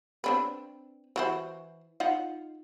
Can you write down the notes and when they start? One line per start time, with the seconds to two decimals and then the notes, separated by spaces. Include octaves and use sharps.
0.24 C4 D4 B4
1.16 E3 F#4 C5
2.00 D#4 F4 F#5